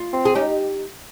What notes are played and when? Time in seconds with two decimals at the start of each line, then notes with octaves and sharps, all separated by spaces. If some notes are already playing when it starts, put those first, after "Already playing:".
Already playing: F4
0.13 C4
0.25 G#4
0.35 C#4 D#4 G4